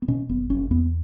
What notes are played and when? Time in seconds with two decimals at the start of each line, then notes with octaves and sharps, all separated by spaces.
0.02 B3
0.08 B2 C#4
0.29 F#1 B3
0.50 F#1 C#4
0.71 E2 B3